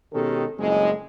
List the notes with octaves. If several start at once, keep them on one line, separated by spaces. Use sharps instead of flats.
B2 D#3 G#3 C#4 G4 A4
F#1 F2 A2 G#3